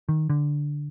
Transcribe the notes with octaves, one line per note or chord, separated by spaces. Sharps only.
D#3
D3